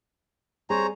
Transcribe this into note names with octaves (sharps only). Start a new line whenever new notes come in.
G3 C4 G#4 C5 C#5 A#5